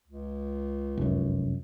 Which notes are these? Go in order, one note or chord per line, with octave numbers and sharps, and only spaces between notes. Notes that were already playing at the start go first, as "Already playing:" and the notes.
C#2
F1 F#2